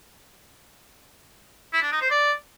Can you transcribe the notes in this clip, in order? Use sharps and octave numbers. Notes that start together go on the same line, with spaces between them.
E4
D4
D#4
C5
D5